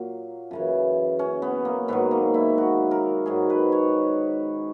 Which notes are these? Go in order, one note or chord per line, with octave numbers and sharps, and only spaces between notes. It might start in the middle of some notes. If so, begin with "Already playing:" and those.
Already playing: A#2 F#3
F#2 C#3 E3
C#4
B3
A#3
G#2 D#3 F#3 B3
A#3
E4
F#4
A#4
G#2 D#3 F#3 G#4
B4
C#5